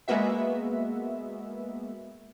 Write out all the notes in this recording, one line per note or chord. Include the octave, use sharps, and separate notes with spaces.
G#3 A#3 B3 F#4 E5